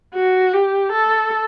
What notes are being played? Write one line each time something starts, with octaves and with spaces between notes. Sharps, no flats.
F#4
G4
A4